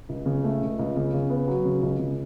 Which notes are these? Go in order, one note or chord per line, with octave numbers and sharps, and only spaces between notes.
C#2
C#3
A3
C#2
C#2
C#3
C#3
B3
F#3
C#3
C#2
C#3